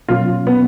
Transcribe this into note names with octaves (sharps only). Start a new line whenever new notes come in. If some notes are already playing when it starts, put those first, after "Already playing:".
B2 F#3 A#3 C#4 F4
B3